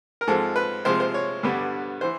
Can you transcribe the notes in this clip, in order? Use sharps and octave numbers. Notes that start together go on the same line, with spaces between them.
A#4
G#2 F3 G#3 C4 A4
B4
C3 F3 G#3 C4 C5
C5
C#5
G2 D3 G3 B3
E3 C5